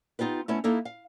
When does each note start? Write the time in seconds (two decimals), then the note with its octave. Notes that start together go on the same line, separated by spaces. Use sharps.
0.19 B3 D#4 F4 G4 B4
0.48 A3 B3 C#4 E4 C#5
0.64 A#3 D#4 E4 A4
0.85 F5